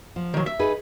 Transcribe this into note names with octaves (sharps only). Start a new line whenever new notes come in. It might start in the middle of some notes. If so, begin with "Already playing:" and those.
F3
D#3 F#3
E5
D#4 G#4 B4